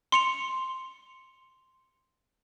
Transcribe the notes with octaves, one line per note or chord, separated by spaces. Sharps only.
C6 C#7 F7